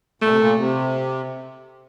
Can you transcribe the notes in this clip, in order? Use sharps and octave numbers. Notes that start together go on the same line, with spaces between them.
A#2 A3
C3
A#2
C3